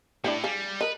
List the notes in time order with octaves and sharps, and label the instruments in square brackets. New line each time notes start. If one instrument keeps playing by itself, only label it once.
[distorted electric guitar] A2 [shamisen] D4 E4 G4
[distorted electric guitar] G3 [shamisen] G#4 F5
[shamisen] A#4 D#5 [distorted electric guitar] B4